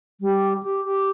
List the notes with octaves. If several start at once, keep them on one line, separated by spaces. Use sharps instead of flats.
G3
G4
G4